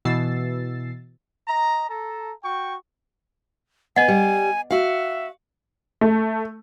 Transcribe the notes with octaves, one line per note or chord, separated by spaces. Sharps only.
B2 E3 E6 A6 C7
D#5 A#5
A4 A5 A#5
F#4 G5 C#6
B3 D#5 F#5 G#5
G3
F#4 E5 F5
A3